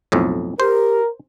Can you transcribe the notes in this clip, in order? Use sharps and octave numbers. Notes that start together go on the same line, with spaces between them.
B1 F2 A2
G4 A#4 C5